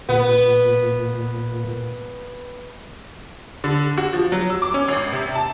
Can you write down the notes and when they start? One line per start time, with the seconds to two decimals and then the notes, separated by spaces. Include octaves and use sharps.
0.09 A#2 B3
3.64 D3
3.98 F#4
4.13 F3
4.32 F#3
4.50 E6
4.62 D6
4.74 C#4
4.88 G#1
5.12 C3
5.35 A5